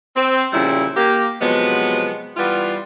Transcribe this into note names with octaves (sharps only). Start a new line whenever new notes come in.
C4
A#2 C#3 F3 G3 C#4 E4
A#3 G4
C3 F3 F#3 G#3 B3
E3 G3 B3 F4